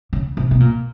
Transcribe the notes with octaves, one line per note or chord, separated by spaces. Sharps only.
C#3
C3
B2
A#2